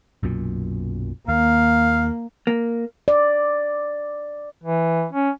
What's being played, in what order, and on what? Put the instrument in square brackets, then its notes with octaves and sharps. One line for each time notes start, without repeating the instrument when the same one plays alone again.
[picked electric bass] B1 F#2 A#2
[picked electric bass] D#2 [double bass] A#3 [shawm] F5
[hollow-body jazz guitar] A#3
[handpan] D5
[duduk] E3
C#4